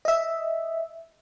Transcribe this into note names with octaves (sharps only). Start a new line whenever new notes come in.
D#5 E5